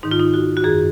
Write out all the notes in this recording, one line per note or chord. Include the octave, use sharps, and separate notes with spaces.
G#2 D#3 D#4
F4
D#4
F#4
F#4
F#2 D#3 G#4